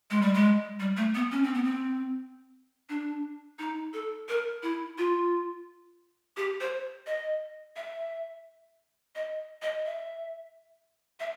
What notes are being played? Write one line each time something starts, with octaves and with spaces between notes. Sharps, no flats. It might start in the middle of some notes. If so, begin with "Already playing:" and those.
G#3
G3
G#3
G3
A3
B3
C#4
C4
B3
C4
D4
D#4
A4
A#4
E4
F4
G4
C5
D#5
E5
D#5
D#5
E5
E5